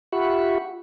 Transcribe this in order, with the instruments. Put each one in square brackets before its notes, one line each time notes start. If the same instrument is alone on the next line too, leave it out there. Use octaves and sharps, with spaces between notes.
[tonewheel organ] F4 G4 E5 F#5 B5 C#6